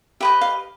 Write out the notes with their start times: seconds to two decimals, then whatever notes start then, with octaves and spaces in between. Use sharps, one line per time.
0.20 G4 B4 D#5 E5
0.41 F5